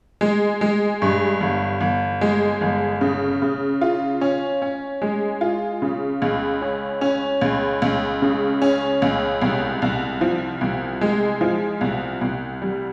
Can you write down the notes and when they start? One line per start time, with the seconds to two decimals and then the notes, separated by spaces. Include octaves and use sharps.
0.21 G#3
0.61 G#3
1.02 G2
1.41 G1
1.81 G1
2.21 G#3
2.61 G1
3.01 C#3
3.42 C#3
3.81 F4
4.21 C#4
4.62 C#4
5.02 G#3
5.41 F4
5.82 C#3
6.22 C#2
6.62 C#4
7.01 C#4
7.41 C#2
7.82 C#2
8.22 C#3
8.62 C#4
9.02 C#2
9.42 C2
9.82 C2
10.21 F3
10.61 C2
11.01 G#3
11.41 F3
11.81 C2
12.21 C2
12.62 G3